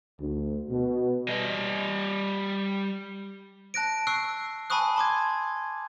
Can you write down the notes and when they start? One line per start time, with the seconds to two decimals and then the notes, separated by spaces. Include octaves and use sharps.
0.20 D2
0.69 B2
1.29 G3 D#5
3.74 A5 F#6 A#6 D7
4.07 C#6 E6 F#6 C7
4.70 G#5 A5 B5 C#6 D#6 F#6
4.96 A5 C6 D6 G#6